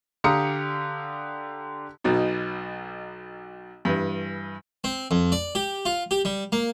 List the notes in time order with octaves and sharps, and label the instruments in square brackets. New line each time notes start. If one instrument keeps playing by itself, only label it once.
[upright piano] D3 G4 F5 A#5 D#6 C#7
[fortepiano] B1 B2 D#4
G2 E3
[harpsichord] C4
F2
D5
G4
F4
G4
G3
A#3